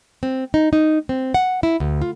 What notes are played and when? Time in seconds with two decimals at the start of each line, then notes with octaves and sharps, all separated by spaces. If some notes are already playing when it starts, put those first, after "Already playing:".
0.23 C4
0.54 D#4
0.73 D#4
1.09 C4
1.34 F#5
1.63 E4
1.80 D2
2.02 F4